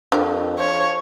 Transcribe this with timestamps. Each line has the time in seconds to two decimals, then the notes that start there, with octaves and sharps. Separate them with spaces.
0.12 F2 D4 G4 A#4
0.58 F3 C#5